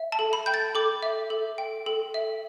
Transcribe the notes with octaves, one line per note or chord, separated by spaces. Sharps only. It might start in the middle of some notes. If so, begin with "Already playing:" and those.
Already playing: E5
A5
A4
B5
G5 G6
A6
A4 D6
E5
A4
G5
A4
E5